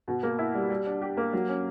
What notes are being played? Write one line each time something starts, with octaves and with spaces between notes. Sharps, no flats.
B2
A#3
E4
G3
G3
D4
G4
A#3
F#3
C#4